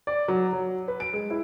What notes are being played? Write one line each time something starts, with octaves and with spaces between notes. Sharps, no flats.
D5
F#3
F#3
B4
D7
G#3
E4